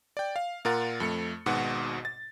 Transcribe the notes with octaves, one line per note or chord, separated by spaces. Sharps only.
D5 G5
F5
A#2 F4 A#4 F#5 A6
F2 A3 C#7
G#1 G#2 B2 F#4 F#5
A6